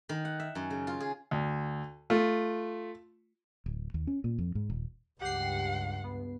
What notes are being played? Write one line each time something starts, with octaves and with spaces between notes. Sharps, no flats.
D#3
F#5
E5
F#2
C#3
F4
G#4
D2
A3 F4
D1
D#2
C#4
A#2
F2
G#2
D#1
C#2 G2 G4 F#5 C7
B3